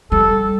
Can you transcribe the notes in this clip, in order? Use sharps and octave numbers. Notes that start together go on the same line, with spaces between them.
G3 A4